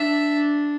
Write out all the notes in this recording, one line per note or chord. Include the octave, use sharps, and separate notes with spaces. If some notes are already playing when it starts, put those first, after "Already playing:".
Already playing: D4 E5